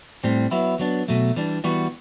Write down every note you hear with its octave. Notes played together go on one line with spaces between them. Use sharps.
A2 G3 C4
F#3 B3 E4
F#3 B3 D4
B2 F#3 A3
E3 G3 D4
E3 G3 B3 F#4